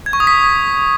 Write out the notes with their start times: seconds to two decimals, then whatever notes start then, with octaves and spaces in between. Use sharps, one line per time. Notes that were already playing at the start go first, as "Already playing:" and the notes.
0.06 G#6
0.13 C#6
0.20 D#6
0.27 B6